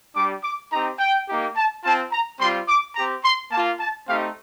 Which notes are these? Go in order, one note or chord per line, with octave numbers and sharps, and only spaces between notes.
G3 D4 G4 D6
D6
C4 D#4 G4 A#5
G5
A#3 D#4 G4
A5
C4 F4 A5
A#5
G3 C4 F4 C6
D6
C4 G4 A#5
C6
A#3 F4 A5
A5
A3 C4 D#4 G4 F5